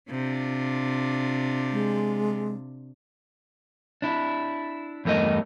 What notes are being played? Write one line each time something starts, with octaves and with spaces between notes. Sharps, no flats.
C3 D4 F4
G#3
D4 E4
E2 G2 A3 A#4 D#5